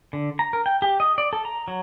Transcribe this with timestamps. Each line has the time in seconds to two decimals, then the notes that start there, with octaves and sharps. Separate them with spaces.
0.13 D3
0.39 A#5
0.53 A#4
0.66 G5
0.82 G4
1.00 D#5
1.18 D5
1.33 A4
1.45 A#5
1.68 F#3